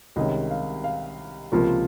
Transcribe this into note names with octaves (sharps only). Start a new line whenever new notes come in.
C2 C3 D#3 G#3 C#4 D#5
F5
F5
C#2 C3 F3 A#3